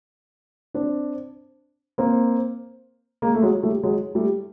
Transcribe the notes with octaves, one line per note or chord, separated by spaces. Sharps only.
C4 D4
A#3 C4
G#3 A#3
A3
F#3 G#3
G3 A3
F#3 G#3
G3 A3